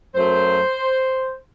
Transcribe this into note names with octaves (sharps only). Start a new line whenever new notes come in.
F#2 F#3 A3 C5